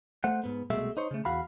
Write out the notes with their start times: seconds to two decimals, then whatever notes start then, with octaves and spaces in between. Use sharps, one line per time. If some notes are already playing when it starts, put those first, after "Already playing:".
0.24 A3 C5 F#5
0.44 G#2 B3
0.70 C2 B2 G#3 A3 E5
0.97 D#4 C5 C#5
1.11 C#3 A3
1.25 E2 F#4 F5 B5